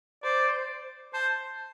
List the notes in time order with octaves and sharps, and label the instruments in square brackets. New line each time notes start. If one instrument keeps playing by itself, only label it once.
[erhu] C5 [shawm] D5
[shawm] C5 [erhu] A5